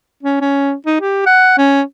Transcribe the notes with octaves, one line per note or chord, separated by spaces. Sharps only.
C#4
C#4
D#4
G4
F#5
C#4